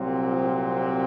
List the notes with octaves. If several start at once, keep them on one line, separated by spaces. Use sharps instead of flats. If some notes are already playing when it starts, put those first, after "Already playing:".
Already playing: C2 A#2 F#3 C4
F3 F4